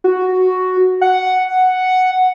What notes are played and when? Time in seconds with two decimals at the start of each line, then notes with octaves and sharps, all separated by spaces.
0.04 F#4
1.01 F#5